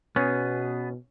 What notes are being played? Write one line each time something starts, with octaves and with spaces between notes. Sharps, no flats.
B2 B3 C#4 G#4